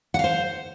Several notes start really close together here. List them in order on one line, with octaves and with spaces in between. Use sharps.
F#5 F5 C5